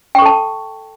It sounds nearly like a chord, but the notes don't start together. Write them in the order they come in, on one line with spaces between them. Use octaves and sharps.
G5 C#6 A4 A5